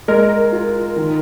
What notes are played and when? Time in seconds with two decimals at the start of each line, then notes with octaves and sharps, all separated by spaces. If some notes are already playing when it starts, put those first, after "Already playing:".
0.08 G#3 A#4
0.52 F4
0.96 D#3